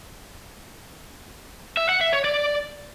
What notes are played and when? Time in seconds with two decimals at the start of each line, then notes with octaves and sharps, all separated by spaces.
1.77 E5
1.89 F#5
2.01 E5
2.13 C#5
2.24 D5